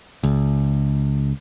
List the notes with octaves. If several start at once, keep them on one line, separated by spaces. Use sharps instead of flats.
C#2